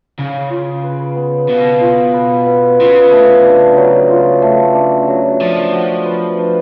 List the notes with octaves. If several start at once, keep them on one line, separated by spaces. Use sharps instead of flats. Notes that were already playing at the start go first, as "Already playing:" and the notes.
C#3 F5
F4
B4
B3
B2 F5
F4
B4
B3
C#3 F4
A3
D4
F#3
F4
A3
D4
F#3
F3 D4
F#4
B4
D4